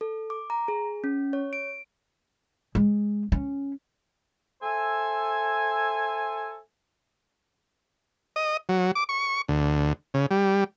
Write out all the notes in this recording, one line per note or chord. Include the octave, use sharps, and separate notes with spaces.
A4
D6
A#5
G#4
C#4
C#5
D7
G#3
C#4
A4 C5 E5 G#5
D#5
F#3
D6
C#6
D2
C#3
G3